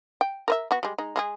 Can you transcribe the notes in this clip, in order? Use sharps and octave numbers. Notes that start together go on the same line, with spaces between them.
G5
A#4 B4 E5
B3 F#4
G3 G#3
G#3 D#4
G#3 E4 G#4